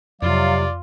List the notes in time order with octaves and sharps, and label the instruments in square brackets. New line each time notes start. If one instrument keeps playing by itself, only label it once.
[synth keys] F2 [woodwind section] C3 F#3 F5 [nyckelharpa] F4 [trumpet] D5